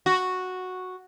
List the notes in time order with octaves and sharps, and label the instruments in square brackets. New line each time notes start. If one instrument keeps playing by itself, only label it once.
[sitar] F#4